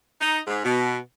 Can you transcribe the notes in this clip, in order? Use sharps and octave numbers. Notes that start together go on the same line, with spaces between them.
D#4
G#2
B2